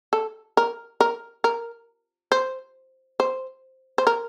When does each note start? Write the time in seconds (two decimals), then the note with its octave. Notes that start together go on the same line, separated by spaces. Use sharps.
0.13 A4
0.57 A#4
1.01 A#4
1.44 A#4
2.32 C5
3.20 C5
3.98 C5
4.07 A#4